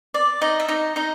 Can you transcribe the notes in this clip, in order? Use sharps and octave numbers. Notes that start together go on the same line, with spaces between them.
D5
D#4 D#5
E5
D#4 D#5
D#4 D#5